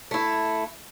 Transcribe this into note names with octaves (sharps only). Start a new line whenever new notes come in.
A3 E4